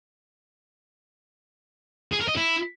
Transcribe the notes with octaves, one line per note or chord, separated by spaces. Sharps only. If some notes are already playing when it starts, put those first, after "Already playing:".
G#4
A#4
D#5
E4